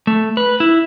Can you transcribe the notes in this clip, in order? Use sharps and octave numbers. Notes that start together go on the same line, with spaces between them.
A3
B4
E4